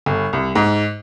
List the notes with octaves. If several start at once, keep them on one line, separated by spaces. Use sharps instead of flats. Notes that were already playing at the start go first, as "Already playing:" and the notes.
G1
C2
G#2